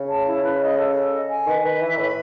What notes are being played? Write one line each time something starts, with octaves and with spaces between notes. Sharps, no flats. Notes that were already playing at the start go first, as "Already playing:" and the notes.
Already playing: C#3
A5
E4
B4
D#5
A4
A4
D#5
G#5
D#3 B4
D#3 B4
E3 E5
A2 B5